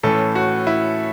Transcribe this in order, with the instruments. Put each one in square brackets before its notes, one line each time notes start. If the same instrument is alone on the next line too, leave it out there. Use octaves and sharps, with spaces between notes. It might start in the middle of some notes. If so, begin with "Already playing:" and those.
[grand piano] A2 E3 A3 C#4 A4
F#4
E4